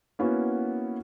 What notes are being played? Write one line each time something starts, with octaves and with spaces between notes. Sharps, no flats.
A#3 B3 C#4 E4 F#4